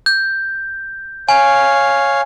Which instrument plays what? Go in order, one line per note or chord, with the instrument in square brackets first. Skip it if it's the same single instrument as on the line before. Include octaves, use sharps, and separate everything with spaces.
[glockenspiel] G6
[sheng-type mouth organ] C#5 F5 [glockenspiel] G#5